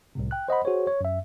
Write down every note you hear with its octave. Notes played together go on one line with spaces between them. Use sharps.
C2 A2 C3
G5 F#6
C5 D#5 F#5 B5
F#4 G#4 C5 C#5
C#5
F#2 E5